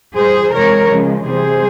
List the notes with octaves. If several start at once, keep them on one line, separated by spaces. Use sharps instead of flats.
A#2 G3 G#4 C5
C3 E3 G#3 A#4 C#5
C#3 F3 G#3
C3 E3 G3 G#4 C5